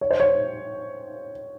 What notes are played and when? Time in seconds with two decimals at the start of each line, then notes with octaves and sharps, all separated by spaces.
0.01 C#5
0.11 C5
0.20 C#5